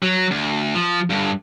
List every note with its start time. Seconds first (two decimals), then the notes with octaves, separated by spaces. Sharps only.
0.03 F#3
0.31 D2
0.75 F3
1.10 G2 D3